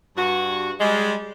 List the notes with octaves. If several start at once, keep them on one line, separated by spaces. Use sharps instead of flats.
G2 F#4
G3 G#3